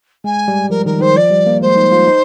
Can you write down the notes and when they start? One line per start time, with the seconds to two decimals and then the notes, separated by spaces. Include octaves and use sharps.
0.24 G#3 G#5
0.48 G3
0.70 F3 A#4
0.86 D#3 A#4
1.00 D#3 C5
1.16 F3 D5
1.30 G3
1.46 A#3
1.61 G#3 C5
1.76 D#4
1.92 F4
2.07 D#4